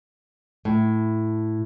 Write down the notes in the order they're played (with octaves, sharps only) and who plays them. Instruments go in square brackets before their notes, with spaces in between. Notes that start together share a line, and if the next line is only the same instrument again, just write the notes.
[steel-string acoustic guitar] A2